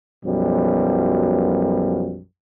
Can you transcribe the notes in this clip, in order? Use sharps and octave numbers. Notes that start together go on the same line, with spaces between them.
B1 F#2 B2 F3 G3